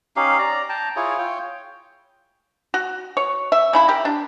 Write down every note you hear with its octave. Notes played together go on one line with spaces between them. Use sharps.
C#4 D#4 G4 F5
D5 A#5
G5 A5 A#5
E4 F4 G#4 C#5
F4 C#5 G5
F#4
C#5
E5
C#3 E4 B5
G4 A#4
D4